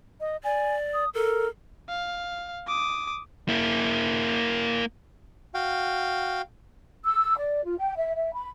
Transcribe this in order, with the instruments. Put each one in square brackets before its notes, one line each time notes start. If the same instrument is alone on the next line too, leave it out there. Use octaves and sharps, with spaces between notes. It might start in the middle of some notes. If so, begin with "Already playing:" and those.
[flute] D#5
[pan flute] D5 [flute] G#5
[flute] D#6
[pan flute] A4 [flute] A#4
[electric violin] F5
D6 D#6
[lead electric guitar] A#3 E4
[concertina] F#4 F5 G5
[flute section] E6
D5
F4
G5
E5
E5
B5